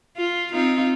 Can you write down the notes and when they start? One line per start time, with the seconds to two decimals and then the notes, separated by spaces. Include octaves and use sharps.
0.17 F4
0.52 C4 D#4 F4